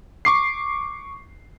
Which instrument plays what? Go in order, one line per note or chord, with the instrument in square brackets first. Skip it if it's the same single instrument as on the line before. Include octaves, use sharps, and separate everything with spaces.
[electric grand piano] C#6 D6 C7